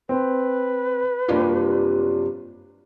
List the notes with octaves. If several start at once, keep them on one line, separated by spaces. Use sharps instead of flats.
C4 B4
F#2 C3 G3 A#3 D4 F4